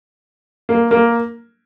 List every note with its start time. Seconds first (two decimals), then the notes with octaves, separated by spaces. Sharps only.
0.69 A#3
0.91 A#3